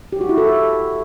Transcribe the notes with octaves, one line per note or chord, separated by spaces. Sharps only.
G4
F#4
E4
A4